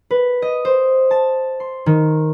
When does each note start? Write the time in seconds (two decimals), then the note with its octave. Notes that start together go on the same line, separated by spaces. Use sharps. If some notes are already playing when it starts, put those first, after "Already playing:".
0.11 B4
0.42 D#5
0.65 C5
1.11 A5
1.60 C6
1.86 D#3